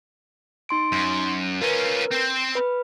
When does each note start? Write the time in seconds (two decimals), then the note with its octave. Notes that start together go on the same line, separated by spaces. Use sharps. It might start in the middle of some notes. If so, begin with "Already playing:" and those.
0.69 D#4 C6 D7
0.92 F#2
1.61 C#4 F4 A#4 B4
2.12 C4 C5
2.55 B4 B5